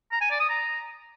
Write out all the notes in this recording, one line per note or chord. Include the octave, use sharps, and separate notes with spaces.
A#5
G#5
D5
D#6
A#5